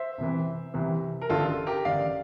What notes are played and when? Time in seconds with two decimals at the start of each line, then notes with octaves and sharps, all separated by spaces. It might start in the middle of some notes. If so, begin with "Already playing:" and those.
Already playing: C5 E5
0.18 C2 C3 E3
0.74 C2 C3 E3
1.21 A#4
1.29 A1 G2 D3 F4 A4
1.66 G4 A#4
1.85 A1 G2 D3 D5 F5